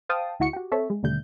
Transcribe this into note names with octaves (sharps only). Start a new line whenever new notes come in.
C5 F5 G5 A5 D#6
D2 E4 F#4 C#6 C#7
F#4 G4
C4 A4 C#5 E5
G#3
D#2 B2 D3 G3 A3 G6